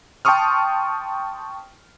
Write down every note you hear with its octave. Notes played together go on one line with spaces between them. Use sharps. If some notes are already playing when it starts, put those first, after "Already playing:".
G5 A5 C6 C#6 D#6 F6